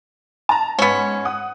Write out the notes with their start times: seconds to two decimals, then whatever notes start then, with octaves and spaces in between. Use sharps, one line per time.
0.49 A5 A#5
0.79 G#2 B3 C#4
1.25 F#5 D#6